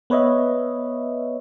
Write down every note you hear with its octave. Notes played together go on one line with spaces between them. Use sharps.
B3 B4 C#5 D#5 E5